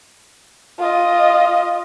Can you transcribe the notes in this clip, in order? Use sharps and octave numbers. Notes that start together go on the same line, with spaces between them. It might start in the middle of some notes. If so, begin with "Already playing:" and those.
F4 D#5